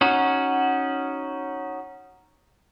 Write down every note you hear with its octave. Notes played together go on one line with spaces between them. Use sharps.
C#4 D#4 F#4